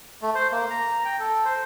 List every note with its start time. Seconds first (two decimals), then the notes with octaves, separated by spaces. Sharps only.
0.22 A3
0.35 C5
0.52 A#3
0.70 A#5
1.05 G5
1.20 A4
1.45 C5